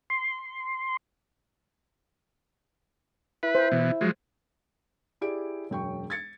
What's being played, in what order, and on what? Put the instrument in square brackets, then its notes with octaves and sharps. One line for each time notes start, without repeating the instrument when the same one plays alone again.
[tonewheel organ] C6
[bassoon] E4 [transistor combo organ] B4
[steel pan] C5
[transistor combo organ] B2 E3
F3 F#3 G#3
[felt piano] E4 G4 G#4 D5 D7
E1 F#2 G5 C#6
G#6 A6 C#7